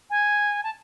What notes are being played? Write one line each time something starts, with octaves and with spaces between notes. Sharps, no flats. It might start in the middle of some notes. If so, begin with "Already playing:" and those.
G#5
A5